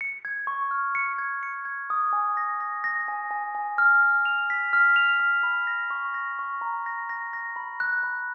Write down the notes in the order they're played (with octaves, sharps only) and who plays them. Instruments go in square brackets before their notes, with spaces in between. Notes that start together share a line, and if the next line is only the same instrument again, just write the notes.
[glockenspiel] C#7
G#6
C#6
F6
C#7
G#6
C#7
G#6
D#6
G#5
A#6
A#6
A#6
G#5
G#5
G#5
F6
F6
F7
B6
F6
F7
F6
B5
A#6
C#6
A#6
C#6
A#5
A#6
A#6
A#6
B5
F#6
B5